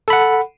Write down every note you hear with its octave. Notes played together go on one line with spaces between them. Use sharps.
A4 F#5 B5